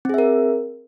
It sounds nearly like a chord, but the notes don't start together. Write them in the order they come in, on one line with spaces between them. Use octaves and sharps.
C4 G#4 E5 A#4